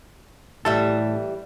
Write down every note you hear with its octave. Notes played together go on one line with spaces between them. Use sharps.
A2 E3 G3 A4 E5